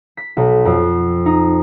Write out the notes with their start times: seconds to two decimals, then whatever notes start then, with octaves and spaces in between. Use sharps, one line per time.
0.17 B6
0.37 B1
0.65 F2
1.26 D#4